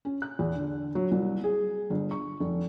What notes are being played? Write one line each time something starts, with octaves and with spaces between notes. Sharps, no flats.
C#4
F#6
E2
D3
F#3
C2
G#4
G1
C#6
F1